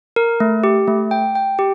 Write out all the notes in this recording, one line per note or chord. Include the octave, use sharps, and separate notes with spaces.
A#4
A3
G4
A3
G5
G5
G4